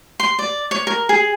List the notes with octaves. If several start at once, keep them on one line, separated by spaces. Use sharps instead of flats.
C6
D5
C#5
A#4
G#4